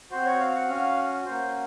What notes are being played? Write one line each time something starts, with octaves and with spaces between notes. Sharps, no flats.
C4 F#4 C5
C#5
F5
F#5
C#4 F#4 F5
A#3 C#4 F#4 C5